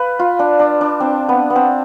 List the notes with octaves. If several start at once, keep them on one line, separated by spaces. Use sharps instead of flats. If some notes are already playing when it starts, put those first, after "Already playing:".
Already playing: B4 F5
F4
D4
D4
D4
C4
B3
B3
C4